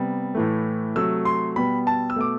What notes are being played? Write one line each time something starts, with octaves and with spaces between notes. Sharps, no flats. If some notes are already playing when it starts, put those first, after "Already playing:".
Already playing: C3 G3 B3
A2 E3 A3
C3 F#3 A3 E6
C6
B2 G3 B3 B5
A5
E6
B2 A3 D6